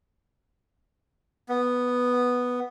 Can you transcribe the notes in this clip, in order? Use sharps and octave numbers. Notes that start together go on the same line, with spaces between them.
B3